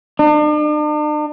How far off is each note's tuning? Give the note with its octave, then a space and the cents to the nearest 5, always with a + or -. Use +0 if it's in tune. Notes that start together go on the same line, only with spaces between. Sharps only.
D4 +45